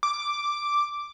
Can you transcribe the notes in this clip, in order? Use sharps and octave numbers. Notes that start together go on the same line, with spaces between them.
D6